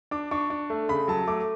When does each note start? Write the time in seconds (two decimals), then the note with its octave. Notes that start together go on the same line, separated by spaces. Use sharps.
0.11 D4 D6
0.31 D4 C#6
0.50 D4
0.70 A3
0.89 C#3 B5
1.08 F#3 A5
1.28 A3 D6